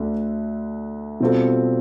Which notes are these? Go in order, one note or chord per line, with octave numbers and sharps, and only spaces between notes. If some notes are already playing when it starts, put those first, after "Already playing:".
Already playing: D2 D3 A3 D4
B2 G3 C4 F4 A4